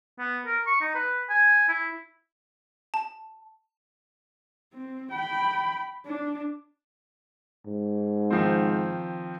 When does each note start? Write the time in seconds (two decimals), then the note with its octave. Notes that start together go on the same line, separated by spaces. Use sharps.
0.19 B3
0.46 A#4
0.67 C#6
0.81 D#4
0.95 B4
1.30 G#5
1.69 E4
2.94 A5
4.73 C4
5.12 G5 B5
6.06 D4
7.66 G#2
8.31 D#3 F3 C4